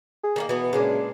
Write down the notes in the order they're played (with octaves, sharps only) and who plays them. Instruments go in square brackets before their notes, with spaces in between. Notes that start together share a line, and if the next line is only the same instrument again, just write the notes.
[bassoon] G#4
[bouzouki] D#3 A3 A#3
[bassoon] B2 [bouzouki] E3 B3
[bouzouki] A#2 G#3 D4 [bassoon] C#3